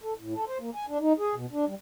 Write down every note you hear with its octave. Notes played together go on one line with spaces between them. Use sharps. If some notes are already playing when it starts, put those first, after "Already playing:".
A4
A2
A4
C5
A#3
G#5
D4
D#4
G#4
B2
D4
G3